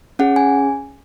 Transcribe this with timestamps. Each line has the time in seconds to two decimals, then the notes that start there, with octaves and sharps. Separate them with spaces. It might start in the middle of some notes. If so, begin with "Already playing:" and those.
0.19 C#4 G#4 F#5
0.36 G#5